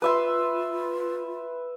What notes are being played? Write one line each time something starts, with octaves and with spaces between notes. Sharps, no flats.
F4 B4 E5 C6